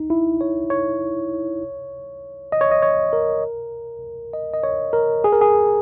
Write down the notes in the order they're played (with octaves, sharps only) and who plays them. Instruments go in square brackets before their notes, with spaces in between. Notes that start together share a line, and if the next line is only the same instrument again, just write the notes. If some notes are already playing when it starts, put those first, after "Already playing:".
Already playing: [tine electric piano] D#4
E4
C#5
C#5
D#5
C#5
D#5
C#5
A#4
D#5
D#5
C#5
A#4
G#4
A#4
G#4